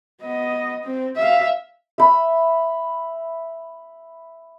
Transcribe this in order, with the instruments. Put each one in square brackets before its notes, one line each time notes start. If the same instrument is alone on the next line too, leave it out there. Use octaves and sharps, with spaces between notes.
[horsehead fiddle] B3 D#5
C4
E5 F5
[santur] E5 B5